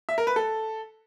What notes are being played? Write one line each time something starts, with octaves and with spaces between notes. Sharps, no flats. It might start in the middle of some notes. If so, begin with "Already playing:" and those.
E5
A#4
B4
A4